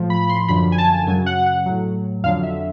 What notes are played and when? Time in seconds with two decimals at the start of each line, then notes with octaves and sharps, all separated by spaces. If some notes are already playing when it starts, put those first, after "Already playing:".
Already playing: A2 F3
0.10 B5
0.29 C6
0.49 F#2 D3 F3 B5
0.72 G#5
0.78 A5
1.07 F#2 C#3 F#3 G#5
1.26 F#5
1.46 F#5
1.66 A2 F#3
2.23 F2 D3 F#3 F5
2.43 E5